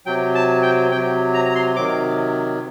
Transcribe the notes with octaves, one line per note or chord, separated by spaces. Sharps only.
C3 F#3 G5
A5
G5
C3 F#3 G5
A#5
A#5
C6
C3 D#3 F#3 D6